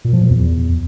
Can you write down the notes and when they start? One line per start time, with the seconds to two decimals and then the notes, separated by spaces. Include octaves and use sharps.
0.05 A#2
0.13 F3
0.21 A#2
0.30 E2